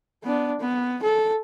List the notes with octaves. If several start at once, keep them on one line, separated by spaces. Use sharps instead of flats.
B3 D4
B3
A4